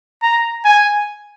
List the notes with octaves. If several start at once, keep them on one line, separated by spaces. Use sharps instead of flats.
A#5
G#5